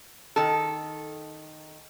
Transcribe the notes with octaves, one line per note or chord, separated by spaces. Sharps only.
D#3 A4